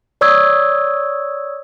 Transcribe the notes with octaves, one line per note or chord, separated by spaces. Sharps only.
C#5 D5 C#6 D#6 E6 G#6